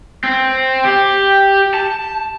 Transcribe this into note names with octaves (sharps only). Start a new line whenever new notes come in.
C4
G4
A5